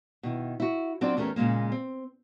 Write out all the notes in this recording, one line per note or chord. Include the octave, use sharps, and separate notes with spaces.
B2 D#3 E4
E4 F#4
F#3 C4 D4 F4 D5
E2 A3 C#4 G4 A#4
A#2 C#3 G#3 A#3
C4